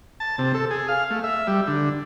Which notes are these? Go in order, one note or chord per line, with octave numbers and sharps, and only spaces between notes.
A5
C3
A4
G#4
F5
A3
E5
G3
D3